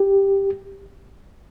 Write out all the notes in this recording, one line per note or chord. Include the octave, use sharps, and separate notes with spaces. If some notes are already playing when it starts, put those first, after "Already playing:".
Already playing: G4